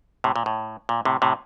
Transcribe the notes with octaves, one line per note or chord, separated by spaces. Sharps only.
A2 C3
A#2
A2
A#2
A2 C3
A2 C3